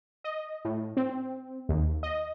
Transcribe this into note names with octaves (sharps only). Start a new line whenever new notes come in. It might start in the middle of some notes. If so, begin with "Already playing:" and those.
D#5
A2
C4
D#2
D#5